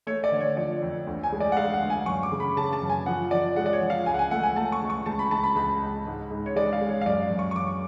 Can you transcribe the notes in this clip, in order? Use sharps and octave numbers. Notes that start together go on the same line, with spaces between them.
A3 C#5
D5
D3
C#5
F3 D5
F2
D2
G#5
G#3
D5
F#5
G#3 F5
F#5
D2
G#5
F#2 C#6
D6
C#3
B5
C#3 A5
A5
F#2
G#5
F3 F#5
F3 D5
G#3 F#5
D5
C#5
F3
F5
C#2 G#5
F#5
G#5
A3 F#5
G#5
A3 A5
C#6
C#2
C#6
C#2 A5
B5
C#2 A5
B5
C#2 B5
C#2
G#2
G#2
C#5
G#3 D5
F5
G#3
C#5
F5
F#2 D5
F#2
C#6
C#6
F#2 D6